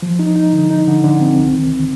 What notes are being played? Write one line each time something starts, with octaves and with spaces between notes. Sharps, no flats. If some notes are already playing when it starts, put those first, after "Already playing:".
F3
D#4
D#4
D3
D#4
D3
D3
C4
C2
D#3